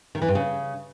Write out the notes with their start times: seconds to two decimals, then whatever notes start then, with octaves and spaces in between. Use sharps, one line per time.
0.15 D#3
0.22 E3
0.28 G2
0.35 C#3